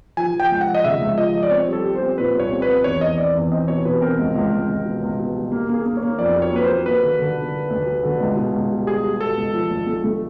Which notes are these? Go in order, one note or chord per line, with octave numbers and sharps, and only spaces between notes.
F3 G#5
F3
G5
C#2
F#5
F3
D#5
C#3 E5
C#2
F3 D#5
F3
D5
C4 C#5
G3 A4
G3
C5
C4
A#2 B4
C2 C#5
C4
B4
C4
E2 C#5
E2 D#5
C4 D5
E2
C4 D#5
B2 C#5
B2 B4
C4 A#4
C#2
C#2
C#2
C#2
B2
C#2
B2
G3
A#3
A#3 G#4
A#3
C#5
A#3
F2 D5
F#3
C#5
A#3 B4
C5
F#3
A#3 B4
D3
D3
D3
F#3
D2
F#3
D3
C#2
B2
C#2
G3
G3 G#4
G3
B2 A4
C#2
F3
D2
A3
A3